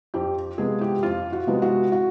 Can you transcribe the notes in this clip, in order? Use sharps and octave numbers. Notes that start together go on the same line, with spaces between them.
F2 G4
C3 F3 G#3 B3 G#4
G4
F2 F4
F#4
C3 F3 G#3 B3
F#4
F#4